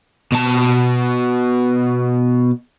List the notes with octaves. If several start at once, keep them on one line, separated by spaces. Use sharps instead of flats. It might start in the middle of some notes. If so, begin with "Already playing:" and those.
B2 A5